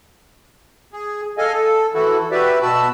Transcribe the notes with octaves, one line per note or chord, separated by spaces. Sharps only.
G#4
A4 D#5 F5 G#5
A4
E3 E4 F#4 A4
F#4 G4 B4 D5 E5
B2 F#4 A5 B5 E6